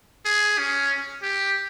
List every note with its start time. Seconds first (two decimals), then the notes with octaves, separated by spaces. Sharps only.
0.25 G#4
0.58 C#4
1.23 G4